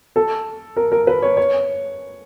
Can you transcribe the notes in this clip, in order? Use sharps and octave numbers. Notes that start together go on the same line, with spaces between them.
A4
A#4
A#4
B4
C#5
C#5